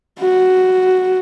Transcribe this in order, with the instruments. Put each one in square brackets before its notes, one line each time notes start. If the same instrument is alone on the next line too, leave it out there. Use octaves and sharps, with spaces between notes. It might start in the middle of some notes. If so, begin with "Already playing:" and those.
[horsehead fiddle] F#4